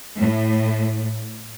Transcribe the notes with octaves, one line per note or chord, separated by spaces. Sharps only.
A2